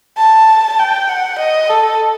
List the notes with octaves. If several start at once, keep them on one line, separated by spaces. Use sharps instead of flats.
A5
G5
F#5
D#5
A4